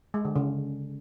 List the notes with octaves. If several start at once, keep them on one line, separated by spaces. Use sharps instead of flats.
G#3
D3
C#3